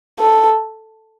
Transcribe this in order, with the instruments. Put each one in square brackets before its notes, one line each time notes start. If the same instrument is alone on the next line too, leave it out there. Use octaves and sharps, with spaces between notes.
[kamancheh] A4